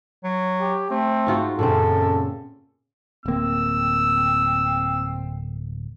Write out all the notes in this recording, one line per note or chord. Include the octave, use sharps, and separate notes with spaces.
F#3
G4
A3 C4
G#2 F4 F#4
F#2 A#2 C#3 C4 A4
D1 A#3 C4 E6